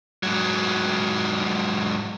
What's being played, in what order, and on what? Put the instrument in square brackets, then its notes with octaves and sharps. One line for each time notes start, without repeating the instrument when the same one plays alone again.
[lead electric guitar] G#2 F#3